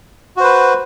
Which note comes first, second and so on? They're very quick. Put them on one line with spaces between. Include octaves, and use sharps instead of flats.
F#4 C5 B4